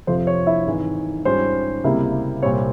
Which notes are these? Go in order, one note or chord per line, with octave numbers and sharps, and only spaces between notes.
F2 C3 F3 C5
C#5
E4 E5
G#1 G#2 E3
G#2 G3 C#4 F4 C5
C#2 C3 G3 A#3 E4
C2 A#2 G3 C4 C#5